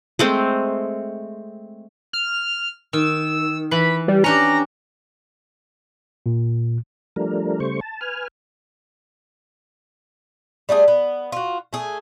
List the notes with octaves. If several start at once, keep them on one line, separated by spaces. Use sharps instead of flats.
G#3 A3 C4
F6
D#3 E6
E3 B5
G3
C#4 D4 G4 A#5
A#2
F3 G3 A3 D4 A#4
C#3 G3 A3 C5 C#6
A5
B4 G#5 F6
G3 A3 D4 G#4
B3
F4 F#4
A3 G#4